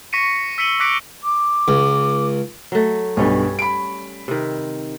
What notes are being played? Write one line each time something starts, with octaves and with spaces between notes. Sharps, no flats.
C#6 A#6 B6 C#7 D#7
E6 B6 C#7 D#7 F#7
D6 F#6 A#6 B6 C#7 D7
D6
C#2
F#3 A3
B1 G2 G3 C#4 C#5
B5 D7
C3 D#3